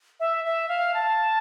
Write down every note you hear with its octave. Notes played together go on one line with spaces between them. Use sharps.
E5
E5
F5
A5